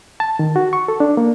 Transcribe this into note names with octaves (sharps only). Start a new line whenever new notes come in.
A5
D#3
F#4
C#6
A4
D4
A#3